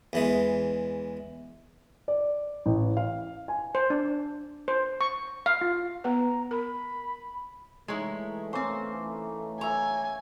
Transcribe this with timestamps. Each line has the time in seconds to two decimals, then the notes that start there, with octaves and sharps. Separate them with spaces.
0.13 E2 E3 G#3
2.08 D5
2.66 A1
2.97 F5
3.48 G#5
3.75 C5
3.90 D4
4.68 C5
5.01 C#6
5.46 F5
5.61 F4
6.04 B3 B4 A#5
6.51 A#4 B5
7.88 E3 G#3 A3 D#4 E4 C#5 E5
8.53 A#3 C4 C#4 C5
9.61 C#5 E5 G#5 A#5